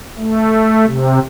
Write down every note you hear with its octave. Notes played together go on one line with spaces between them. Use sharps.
A3
C3